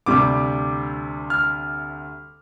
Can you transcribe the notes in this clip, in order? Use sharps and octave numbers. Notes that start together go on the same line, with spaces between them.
D2 C3 G3 D6
F6